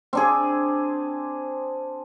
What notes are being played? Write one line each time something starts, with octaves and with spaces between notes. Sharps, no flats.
C4 D4 G#4